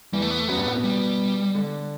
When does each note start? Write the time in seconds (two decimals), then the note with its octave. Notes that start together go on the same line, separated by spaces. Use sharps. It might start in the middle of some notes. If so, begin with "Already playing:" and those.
0.13 E2 E3 G3
0.22 A3
0.31 B3
0.39 A3
0.48 F#2 F#3 B3
0.57 G2 G3
0.66 A2 A3
0.75 B2 B3
0.84 G3
1.55 D3 D4